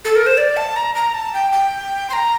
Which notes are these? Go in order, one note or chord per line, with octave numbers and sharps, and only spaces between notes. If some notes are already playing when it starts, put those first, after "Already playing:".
A4
A#4
C5
D5
A5
A#5
A#5
A5
G5
G5
C6
A#5